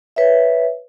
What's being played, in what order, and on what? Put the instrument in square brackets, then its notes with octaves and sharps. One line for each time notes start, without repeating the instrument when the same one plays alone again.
[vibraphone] B4 C#5 E5